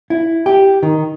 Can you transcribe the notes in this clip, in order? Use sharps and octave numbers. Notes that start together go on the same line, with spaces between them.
E4
G4
D#3